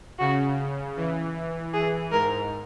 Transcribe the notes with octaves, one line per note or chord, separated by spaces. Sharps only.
C#3 F#4
E3
E3 G#4
G#2 A#4